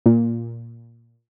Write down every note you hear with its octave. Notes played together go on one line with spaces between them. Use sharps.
A#2